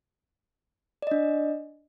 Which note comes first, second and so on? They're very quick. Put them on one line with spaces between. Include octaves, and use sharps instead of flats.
D5 D#5 D4